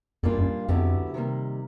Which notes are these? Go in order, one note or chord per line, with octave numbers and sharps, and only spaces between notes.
F2 A#2 G3 A#3 D4 F4
F#2
F2 D3 F#3 B3 E4 G4
C3 D#3 G3 A#3